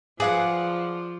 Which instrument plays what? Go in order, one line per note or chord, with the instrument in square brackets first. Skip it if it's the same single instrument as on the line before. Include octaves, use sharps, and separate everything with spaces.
[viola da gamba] F3 [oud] G#4 [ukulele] B4 F5 [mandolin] D5 F#5